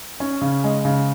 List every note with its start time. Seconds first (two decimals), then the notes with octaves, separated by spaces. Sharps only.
0.20 C#4
0.41 C#3
0.64 G#3
0.85 C#3